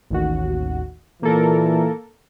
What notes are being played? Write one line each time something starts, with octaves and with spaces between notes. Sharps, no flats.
A1 D#2 F#4
A#2 E3 A#3 A4 A#4